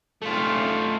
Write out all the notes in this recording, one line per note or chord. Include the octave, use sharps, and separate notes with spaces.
A3 F4